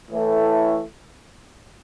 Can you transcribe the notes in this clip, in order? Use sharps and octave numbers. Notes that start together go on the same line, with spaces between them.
A2 E3 A3